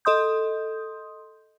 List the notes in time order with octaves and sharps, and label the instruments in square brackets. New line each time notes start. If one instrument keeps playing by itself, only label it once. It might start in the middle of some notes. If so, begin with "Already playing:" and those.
[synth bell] A4 D#5 C6 D#6 G6